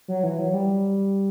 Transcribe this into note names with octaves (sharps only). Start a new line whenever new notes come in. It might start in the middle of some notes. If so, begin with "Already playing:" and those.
F#3
E3
F#3
G3